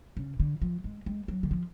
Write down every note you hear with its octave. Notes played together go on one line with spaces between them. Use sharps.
C#3
D3
F3
G#3
G#3
F#3
D3
F3